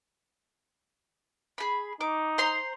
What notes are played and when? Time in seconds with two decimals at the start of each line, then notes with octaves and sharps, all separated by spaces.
1.58 G#4 B5
2.01 D#4 D6
2.38 C5 A#5 C6